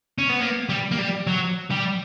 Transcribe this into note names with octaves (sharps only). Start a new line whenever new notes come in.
C#4
B3
A#3
G3
A#3
G3
F#3
G3